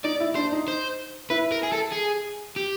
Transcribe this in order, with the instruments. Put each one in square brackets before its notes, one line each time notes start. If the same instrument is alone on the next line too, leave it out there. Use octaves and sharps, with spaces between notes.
[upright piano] D#4 [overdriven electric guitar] D5
[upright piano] E4
[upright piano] D4 [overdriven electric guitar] C5
[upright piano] D#4
[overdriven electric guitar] C5
[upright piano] E4 [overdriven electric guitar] B4
[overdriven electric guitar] A#4
G#4
A4
G#4
G4